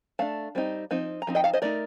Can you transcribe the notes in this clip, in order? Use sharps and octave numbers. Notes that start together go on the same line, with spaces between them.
A3 D4 F5 A5
G3 C4 D#4
F3 C4 D#4
A#5
F3 C4 D#4
D#5 G5
F5 A5
C5 D#5
A3 D#4 A#4 D5